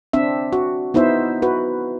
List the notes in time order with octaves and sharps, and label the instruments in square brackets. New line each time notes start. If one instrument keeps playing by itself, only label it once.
[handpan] C4 D4 E5
F#4
B3 D#4 E4 C5 E5
F#4 B4